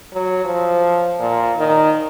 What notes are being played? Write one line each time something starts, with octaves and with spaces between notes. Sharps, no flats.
F#3
F3
A#2
D#3